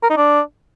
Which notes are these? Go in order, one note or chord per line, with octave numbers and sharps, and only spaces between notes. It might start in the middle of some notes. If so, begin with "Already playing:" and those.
A#4
D#4
D4